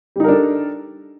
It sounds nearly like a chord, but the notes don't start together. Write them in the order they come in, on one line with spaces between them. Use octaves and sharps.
G3 D#4 A#4 D4 A4